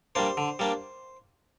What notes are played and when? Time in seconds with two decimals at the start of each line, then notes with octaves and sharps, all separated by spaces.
0.15 G3 A#3 D4 C5
0.37 D3
0.59 G3 A#3 D4